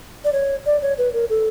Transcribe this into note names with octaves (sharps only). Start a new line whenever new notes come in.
D5
C#5
D5
C#5
B4
A#4
A4